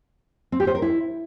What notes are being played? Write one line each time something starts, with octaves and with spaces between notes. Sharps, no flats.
C4
G4
C5
A#4
E4